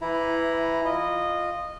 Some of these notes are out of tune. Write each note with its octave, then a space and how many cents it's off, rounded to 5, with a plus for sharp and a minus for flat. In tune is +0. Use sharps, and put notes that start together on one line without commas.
E3 +20 E4 +0 A#5 +0
F4 +0 D#5 -15